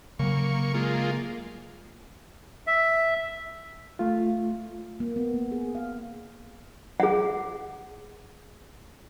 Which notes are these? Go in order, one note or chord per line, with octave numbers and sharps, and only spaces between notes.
C#3 F#3 A#3 C#6
G#3 A#3 F4
E5
A3 F4
A#3
B3
A#3
G#4
F5
G#4 F#5